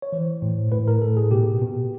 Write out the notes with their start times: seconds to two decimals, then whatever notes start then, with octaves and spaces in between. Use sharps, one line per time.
0.02 C#5
0.12 E3 C5
0.42 A2
0.72 A2 B4
0.88 A#4
1.02 A2 A4
1.17 G#4
1.31 B2 G4
1.61 B2